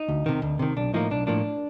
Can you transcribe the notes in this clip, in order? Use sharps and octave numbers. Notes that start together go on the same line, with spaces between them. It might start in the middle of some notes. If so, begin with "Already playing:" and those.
Already playing: D#4
D2
C3 D#3
D2
C3 D#3
B1 D4
A2 F3 A#3 D#4
B1 D4
A2 F3 A#3 D4